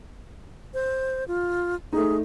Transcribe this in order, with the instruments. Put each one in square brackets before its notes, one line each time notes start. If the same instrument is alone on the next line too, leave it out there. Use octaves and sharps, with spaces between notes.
[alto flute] C5
F4
[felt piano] A3 D#4 [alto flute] G#4